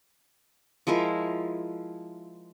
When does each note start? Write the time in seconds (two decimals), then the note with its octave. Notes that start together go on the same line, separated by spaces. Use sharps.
0.87 F3 G#3 E4 A#4